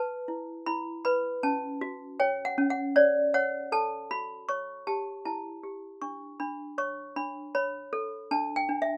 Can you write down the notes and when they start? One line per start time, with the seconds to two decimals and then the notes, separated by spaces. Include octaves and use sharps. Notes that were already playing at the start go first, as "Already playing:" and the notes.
Already playing: B4 A5
0.28 E4
0.66 E4 B5
1.05 B4 B5
1.43 C#4 A5
1.81 F#4
2.20 C#5 G5
2.45 F#5
2.58 C#4
2.70 F#5
2.96 C#5 D5
3.34 C#5 F#5
3.72 A4 A5
4.11 F#4 B5
4.49 C#5 C#6
4.87 G4 A5
5.25 E4 A5
5.63 G4
6.02 D4 C#6
6.40 D4 B5
6.78 C#5 C#6
7.16 D4 B5
7.55 C#5 B5
7.93 A4
8.31 D4 A5
8.56 G5
8.69 D4
8.82 E5